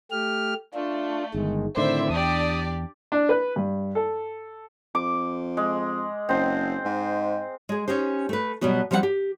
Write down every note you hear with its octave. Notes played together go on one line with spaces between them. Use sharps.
A3 G4 F6
A3 D4 F4
G1 D#3 G#3
A2 D3 D#3 C4 E4 C5 D5 E5
E2 D4 G4 D5 D#6
D4
B4
G2
A4
F2 D6
G#3
F#1 C4 C5
G#2
G#3 G#4
C#4 D#4 G4 C5
A3 B4
B2 F#3 G3 B3 F#4
F3 G3 C4 E4 F#5
G4